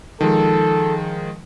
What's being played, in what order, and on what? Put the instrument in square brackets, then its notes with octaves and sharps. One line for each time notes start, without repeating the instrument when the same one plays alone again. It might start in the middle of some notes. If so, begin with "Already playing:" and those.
[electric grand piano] D#3 F3 G#3 [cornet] A4